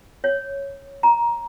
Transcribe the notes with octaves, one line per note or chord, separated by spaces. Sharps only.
C#5
A#5